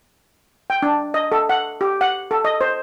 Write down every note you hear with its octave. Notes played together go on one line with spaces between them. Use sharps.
G5
D4
D#5
A4
F#5
G4
F#5
A4
D#5
C5